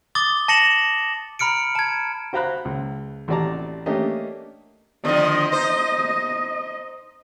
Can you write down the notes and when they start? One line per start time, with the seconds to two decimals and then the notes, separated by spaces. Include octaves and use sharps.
0.15 D6 D#6 A6 G7
0.48 A5 A#6 C#7 E7 F#7
1.39 A#5 B5 F6 C#7 D7
1.75 A5 G#6
2.33 F#4 C5 F5 A#5 B5 F#6
2.65 C#2
3.28 A1 C3 F#4 D5 A5 A#5
3.86 A3 A#3 C#4 D4 G4 D#5
5.05 D3 D#3 F3 D#5
5.52 D#4 C5